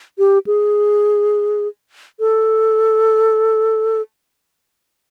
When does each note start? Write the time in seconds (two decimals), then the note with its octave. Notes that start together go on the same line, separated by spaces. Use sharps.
0.18 G4
0.47 G#4
2.20 A4